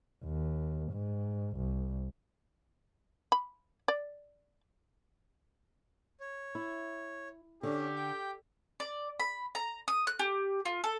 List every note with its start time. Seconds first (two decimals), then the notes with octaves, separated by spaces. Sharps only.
0.24 D#2
0.92 G#2
1.57 C2
3.32 B5
3.88 D5
6.20 C#5
6.55 E4
7.63 D3 C#4 D4 G4
7.96 G5
8.80 D5
9.20 B5
9.55 A#5
9.88 D#6
10.07 F#6
10.19 G4
10.65 F4
10.84 A4